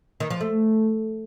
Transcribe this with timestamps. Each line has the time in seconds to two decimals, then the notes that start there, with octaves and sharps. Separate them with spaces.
0.20 D#3
0.30 F3
0.41 A3